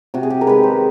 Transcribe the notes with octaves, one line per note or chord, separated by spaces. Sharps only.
C3 F#4
G#4
G4
A#4
D#3 G#3 B4
C5